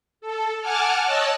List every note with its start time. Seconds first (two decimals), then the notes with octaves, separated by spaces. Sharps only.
0.21 A4
0.60 F#5 G#5 A5 D6 F6
1.02 C#5 D#5 A5 E6 F#6